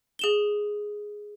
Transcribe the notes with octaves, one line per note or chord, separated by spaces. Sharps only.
G#4 E7 G7